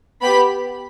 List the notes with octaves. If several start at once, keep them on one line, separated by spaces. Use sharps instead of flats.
B3 G4 B5